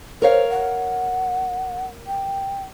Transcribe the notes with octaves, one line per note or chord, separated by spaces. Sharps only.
A#4 C5 C#5 F5
F#5
G5